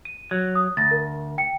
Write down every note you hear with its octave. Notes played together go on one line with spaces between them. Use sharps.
D#7
F#3
D#6
D2 A6 A#6
A#4
G5 C#7